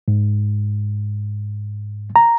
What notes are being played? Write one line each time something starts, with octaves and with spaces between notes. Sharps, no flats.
G#2
A#5